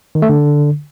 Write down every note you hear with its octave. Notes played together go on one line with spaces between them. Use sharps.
D#3
A3
D3